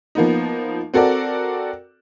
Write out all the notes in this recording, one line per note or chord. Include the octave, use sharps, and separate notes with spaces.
F3 A#3 B3 D#4
C4 F#4 A4 A#4 D5